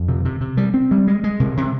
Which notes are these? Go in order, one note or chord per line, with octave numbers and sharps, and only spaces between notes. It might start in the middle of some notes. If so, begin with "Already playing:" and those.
Already playing: F2
C3
C3
C3
G3
C4
G3
G#3
G#3
C3
C3